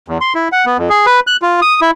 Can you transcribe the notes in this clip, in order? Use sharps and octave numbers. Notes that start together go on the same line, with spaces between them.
E2
C6
E4
F#5
B3
F2
G#4
B4
F#6
F4
D#6
E4